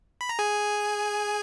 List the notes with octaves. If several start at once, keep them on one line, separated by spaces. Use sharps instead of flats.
B5
A#5
G#4 G#5